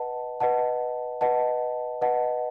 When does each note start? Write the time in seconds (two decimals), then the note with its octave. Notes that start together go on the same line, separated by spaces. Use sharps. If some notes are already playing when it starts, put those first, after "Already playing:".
Already playing: B4 D#5 F#5 A5
0.40 B4 D#5 F#5 A5
1.21 B4 D#5 F#5 A5
2.01 B4 D#5 F#5 A5